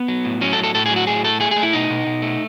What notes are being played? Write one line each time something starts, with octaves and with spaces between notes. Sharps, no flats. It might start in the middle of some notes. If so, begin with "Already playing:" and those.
Already playing: B3
F#3
A2
F#3 C#4
A4
A2
A4
A2 A4
G#4
F#3
F#4
A2 G#4
A3 A4
A3 G#4
A3 G#4
E4
B2 D#4
B2
B2
A3